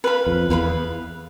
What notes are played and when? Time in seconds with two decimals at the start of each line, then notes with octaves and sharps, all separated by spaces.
0.04 B4 F5 B5
0.27 F2
0.49 E2 B4 F5 B5